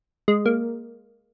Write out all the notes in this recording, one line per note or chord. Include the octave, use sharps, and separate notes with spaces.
G#3
A#3